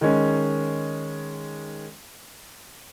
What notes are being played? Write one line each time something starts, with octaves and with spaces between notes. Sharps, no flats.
D#3 G#3 C#4